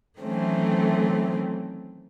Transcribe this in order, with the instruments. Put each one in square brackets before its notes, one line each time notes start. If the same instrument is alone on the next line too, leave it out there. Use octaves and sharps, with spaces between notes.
[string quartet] D#3 E3 F#3 A3 C4 C#4